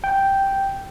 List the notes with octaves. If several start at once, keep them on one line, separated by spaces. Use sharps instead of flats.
G5